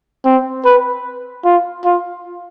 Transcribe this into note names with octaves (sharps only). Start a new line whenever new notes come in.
C4
B4
F4
F4